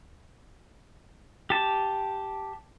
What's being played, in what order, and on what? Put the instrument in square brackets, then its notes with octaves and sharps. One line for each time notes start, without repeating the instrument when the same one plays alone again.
[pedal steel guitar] G4 A5